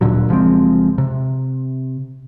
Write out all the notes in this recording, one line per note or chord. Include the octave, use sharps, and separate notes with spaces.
D1 A#2 D3 F#3
F#1 F3 G#3 C4
C3